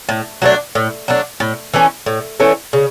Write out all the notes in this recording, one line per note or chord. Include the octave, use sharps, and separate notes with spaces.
A2
F#3 A3 D4
A2
F#3 A3 D4
A2
E3 A3 C#4
A2
E3 A3 C#4
C#3